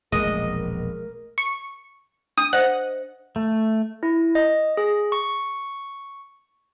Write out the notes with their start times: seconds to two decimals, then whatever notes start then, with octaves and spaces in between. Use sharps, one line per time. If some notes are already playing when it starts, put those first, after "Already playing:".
0.12 E1 A#1 G#3 A#4 D#5
1.38 C#6
2.38 D4 D#6
2.53 C5 D#5 E5 F#5
3.36 A3
4.03 E4
4.35 D#5
4.77 G#4
5.12 C#6